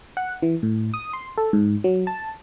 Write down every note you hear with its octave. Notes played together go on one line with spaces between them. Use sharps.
F#5
E3
A2
D#6
C6
A4
G#2
F#3
A5